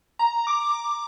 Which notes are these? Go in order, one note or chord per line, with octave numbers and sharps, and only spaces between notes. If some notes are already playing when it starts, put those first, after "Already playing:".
A#5
D6